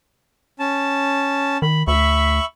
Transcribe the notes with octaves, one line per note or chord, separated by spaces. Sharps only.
C#4 A5
D#3 B5
D2 E5 B5 C#6